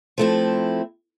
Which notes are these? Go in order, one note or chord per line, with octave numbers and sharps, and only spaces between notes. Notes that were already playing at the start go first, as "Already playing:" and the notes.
F3 A3 C4 E4